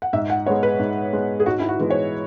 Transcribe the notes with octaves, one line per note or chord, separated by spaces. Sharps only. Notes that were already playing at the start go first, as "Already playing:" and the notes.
F#5
G#2 E5
F#5
G#3 B3 C#5
B4
G#2
G#3 B3
G#4
G#2 F#4
E4
F#4
E3 G#3 B3
C#5